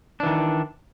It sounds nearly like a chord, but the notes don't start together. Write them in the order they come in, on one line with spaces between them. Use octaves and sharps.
D4 E3 D#3